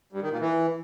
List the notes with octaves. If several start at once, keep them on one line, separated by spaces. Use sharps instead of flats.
G2
D#3
A#2
E3